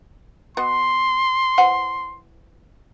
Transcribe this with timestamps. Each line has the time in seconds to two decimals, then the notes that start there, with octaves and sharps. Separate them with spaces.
0.57 B3 F#4 D#5 C6
1.58 E3 C5 F#5